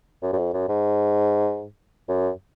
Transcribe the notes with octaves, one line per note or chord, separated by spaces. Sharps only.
F#2
F#2
F2
F#2
G#2
F#2